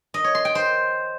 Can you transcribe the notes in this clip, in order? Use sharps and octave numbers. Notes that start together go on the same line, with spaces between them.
D#5
C#5
C6
G5
C5